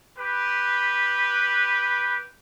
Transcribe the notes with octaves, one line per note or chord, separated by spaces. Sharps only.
G4 B4